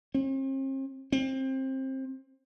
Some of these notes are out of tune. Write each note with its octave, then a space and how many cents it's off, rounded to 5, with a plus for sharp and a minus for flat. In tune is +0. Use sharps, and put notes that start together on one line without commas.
C4 +45
C4 +20